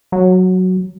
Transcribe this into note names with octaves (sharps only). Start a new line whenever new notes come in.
F#3